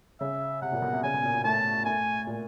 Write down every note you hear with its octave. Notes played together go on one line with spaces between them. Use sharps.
C#3 E5
C3 F#5
A#2
B2
C3
C#3 G#5
B2
A#2
A#2
A2 A5
A2 G#5
A#2